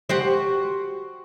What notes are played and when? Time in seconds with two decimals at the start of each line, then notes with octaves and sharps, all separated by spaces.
0.09 F#4 G4 C5